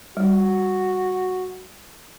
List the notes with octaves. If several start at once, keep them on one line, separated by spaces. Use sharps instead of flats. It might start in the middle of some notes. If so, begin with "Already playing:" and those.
G3 F#4